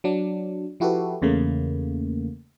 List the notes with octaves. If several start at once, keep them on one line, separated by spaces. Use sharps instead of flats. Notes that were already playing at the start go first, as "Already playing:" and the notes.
F#3 D4
F3 E4 F#4 G4 A4 B4
E2 C#3 A3 A#3